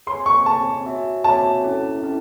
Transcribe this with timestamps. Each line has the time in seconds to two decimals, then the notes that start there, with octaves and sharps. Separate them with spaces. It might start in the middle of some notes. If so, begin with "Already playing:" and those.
0.07 G#4 C#5 G#5 C6
0.26 C#6
0.46 G#4 C#5 G#5 A5
0.86 F#4 C#5 E5 G#5
1.24 F#4 C#5 E5 G#5 A5
1.64 C#4 E4 A4
2.03 C#4 E4 A4